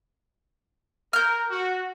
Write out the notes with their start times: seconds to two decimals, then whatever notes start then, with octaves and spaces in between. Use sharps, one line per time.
1.13 A#4 F6 G6
1.50 F#4